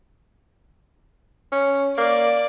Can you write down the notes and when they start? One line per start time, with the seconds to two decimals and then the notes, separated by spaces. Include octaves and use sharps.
1.52 C#4
1.98 A#3 D5